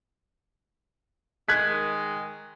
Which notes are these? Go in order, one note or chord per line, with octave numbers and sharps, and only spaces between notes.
D#3 G#3 F#6 G#6 B6